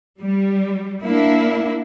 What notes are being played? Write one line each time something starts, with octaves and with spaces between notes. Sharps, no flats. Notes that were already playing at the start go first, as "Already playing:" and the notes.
G3
A#3 D4 E4